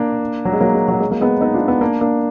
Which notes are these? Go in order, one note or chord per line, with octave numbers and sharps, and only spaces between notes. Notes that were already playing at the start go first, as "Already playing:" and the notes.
Already playing: A#3 D4
F#3
G#3
F#3 A#3
G#3
F#3
G#3
F#3 A#3
G#3 B3
B3 D#4
D4 F4
B3 D#4
A#3 D4
A#3 D4